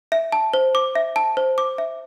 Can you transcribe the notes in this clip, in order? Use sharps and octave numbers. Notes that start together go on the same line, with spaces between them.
E5
A5
C5
D6
E5
A5
C5
D6
E5